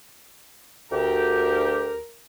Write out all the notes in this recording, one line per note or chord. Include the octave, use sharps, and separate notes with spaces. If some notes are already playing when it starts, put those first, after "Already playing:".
D2 G4 A#4